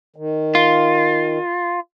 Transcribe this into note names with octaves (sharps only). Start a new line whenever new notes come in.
D#3
F4